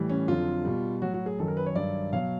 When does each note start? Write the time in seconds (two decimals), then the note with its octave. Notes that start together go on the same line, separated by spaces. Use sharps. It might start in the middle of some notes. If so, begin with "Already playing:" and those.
Already playing: A2 E3 G3
0.09 C#4
0.28 F2 D3 F#3 F4
0.65 B2 G3
1.02 A2 F#3 F#4
1.14 F#4
1.26 G#4
1.39 F#2 D#3 F#3 A4
1.48 A#4
1.57 B4
1.66 C#5
1.75 G2 D#3 F#3 D5
2.12 B2 F#3 F5